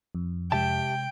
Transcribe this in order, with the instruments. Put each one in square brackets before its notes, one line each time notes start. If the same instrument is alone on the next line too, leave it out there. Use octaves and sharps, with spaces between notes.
[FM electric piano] F2
[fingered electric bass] C3 G#3 [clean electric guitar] G4 E5 A5 [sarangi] G5